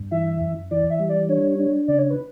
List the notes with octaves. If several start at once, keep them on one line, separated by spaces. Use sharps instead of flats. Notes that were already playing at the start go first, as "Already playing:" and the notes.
Already playing: G2
E3 E5
F#2
E3 D5
E5
G3
D5
D4 C#5
D4
C#3 D5
C#5
B4